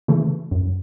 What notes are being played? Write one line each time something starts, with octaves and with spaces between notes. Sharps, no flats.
C#3 E3 A3
F#2